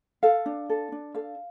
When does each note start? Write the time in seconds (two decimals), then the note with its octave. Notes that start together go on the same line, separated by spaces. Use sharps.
0.23 A4 F5
0.46 D4
0.69 A4
0.92 D4
1.14 A4 F5